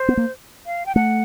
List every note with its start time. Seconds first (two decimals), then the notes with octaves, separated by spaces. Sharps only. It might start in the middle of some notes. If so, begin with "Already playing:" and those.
Already playing: C5
0.08 B3
0.17 A#3
0.66 F5
0.86 G5
0.95 A3 F#5